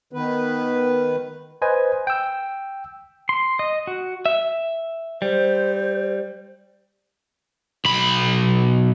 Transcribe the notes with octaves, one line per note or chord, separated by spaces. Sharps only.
D#3 B3 B4
B4 C5 D#5 G#5
G5 E6
C6
D#5
F#4
E5
G3 C5
B1 B5